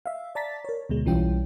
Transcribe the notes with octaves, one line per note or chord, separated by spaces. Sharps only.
E5 F5
D5 A5 A#5 A6 B6
A#4 C#5
D2 B2 G#3
B1 E3 G3 C#4 F4 G5